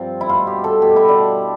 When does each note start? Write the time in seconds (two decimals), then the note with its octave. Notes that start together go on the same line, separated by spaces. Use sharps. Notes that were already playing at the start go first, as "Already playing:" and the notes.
Already playing: G2 F3 C4 F4
0.21 E4
0.29 B2 F4
0.47 G4
0.64 A4
0.82 B2 G4
0.96 E4
1.09 D4